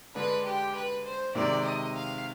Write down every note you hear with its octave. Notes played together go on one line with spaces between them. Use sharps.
D3 G#3 D4 B4
G4
B4
C5
C3 D#3 G#3 D5
D#5
F5